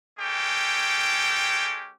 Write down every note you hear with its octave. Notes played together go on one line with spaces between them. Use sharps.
G#3 C#4 G4 A4 G5